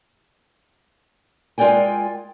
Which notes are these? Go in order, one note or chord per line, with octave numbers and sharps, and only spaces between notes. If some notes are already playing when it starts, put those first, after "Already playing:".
G#3 F4 A#4 D5 G5 G#5